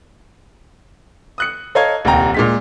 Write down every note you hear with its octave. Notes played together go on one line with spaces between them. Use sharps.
D#6 F#6 C#7
A4 C#5 D#5 F5 A#5 G#6
D#1 C2 F#5 G5 A#5
A#2 G#3 B6